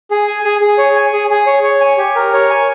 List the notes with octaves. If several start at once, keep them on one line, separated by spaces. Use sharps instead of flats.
G#4
G#5
G#4
G#4
C#5
G#5
G#4
G#4
C#5
C#5
G#5
G4
A#4
C#5
G#5